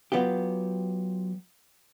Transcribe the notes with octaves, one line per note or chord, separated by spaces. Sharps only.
F#3 B3 F4 G4